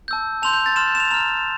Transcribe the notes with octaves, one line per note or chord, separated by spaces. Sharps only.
A5 E6 G6
A5 C6 G6 F7
G6
A6
C6 F6 E7
E7
F7
A#5 F6 F7